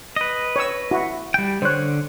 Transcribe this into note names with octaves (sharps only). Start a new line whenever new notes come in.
B4 D#5
C#5 E6
E4 F#4
G3 G5
D3 C5 C#5 F#6